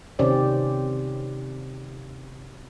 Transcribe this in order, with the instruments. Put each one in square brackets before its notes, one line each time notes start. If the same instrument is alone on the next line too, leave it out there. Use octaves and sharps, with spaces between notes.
[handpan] C3 D#3 C4 C#4 G4 D5